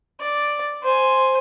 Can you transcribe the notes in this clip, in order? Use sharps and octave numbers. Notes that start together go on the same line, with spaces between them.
D5
C5 G#5